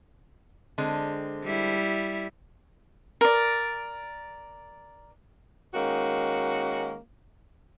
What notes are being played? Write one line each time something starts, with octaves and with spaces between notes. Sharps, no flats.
D3 G#3 C4
G3 E4
A#4 D5
D#3 G#3 A#3 C#4 F#4